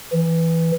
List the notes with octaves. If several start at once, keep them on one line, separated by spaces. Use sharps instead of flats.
E3